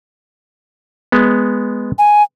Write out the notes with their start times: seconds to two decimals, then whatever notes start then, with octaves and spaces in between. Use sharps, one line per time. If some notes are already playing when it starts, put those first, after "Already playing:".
1.12 G#3 B3
1.98 G#5